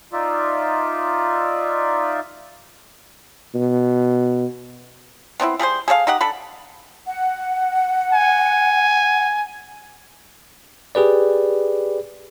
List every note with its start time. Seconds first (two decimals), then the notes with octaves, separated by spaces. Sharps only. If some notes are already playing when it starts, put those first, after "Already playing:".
0.13 D#4 F4 D5 E5
3.55 B2
5.40 B3 C4 D#4 E4
5.59 G3 G#4 A#4 C5
5.88 G#4 A4 C#5 F5
6.07 D#4 G4 D#5 F#5
6.21 D4 A4 B5
7.06 F#5
8.13 G#5
10.95 G4 G#4 B4 D5